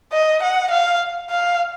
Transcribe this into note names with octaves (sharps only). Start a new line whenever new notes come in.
D#5
F#5
F5
F5